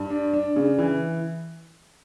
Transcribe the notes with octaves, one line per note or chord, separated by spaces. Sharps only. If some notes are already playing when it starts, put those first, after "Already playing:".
Already playing: G2
D4
D4
C#3
E3